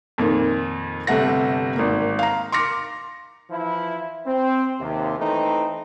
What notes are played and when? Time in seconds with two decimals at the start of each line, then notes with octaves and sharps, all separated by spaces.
0.18 F2 A#2 D#3
1.07 G1 C3 A3 F#5 A#6
1.76 G#1 A#3
2.19 F5 A#5
2.52 C6 D6 F6 A#6 C#7
3.50 E3 F3 E4
4.26 C4
4.79 D#2 C3
5.18 E3 A3 C4 D#4